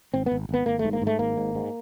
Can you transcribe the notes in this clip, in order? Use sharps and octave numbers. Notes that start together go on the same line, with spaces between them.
G#1 C4
B3
G#1
G#1 B3
G#1 A#3
A3
G#2
A#3
G#2
A3
G#1 A#3
G#2
G#2